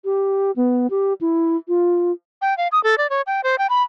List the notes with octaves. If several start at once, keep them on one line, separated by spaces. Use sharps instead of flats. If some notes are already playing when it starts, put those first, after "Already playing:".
G4
B3
G4
E4
F4
G5
F5
D#6
A4
D5
C#5
G5
C5
G5
B5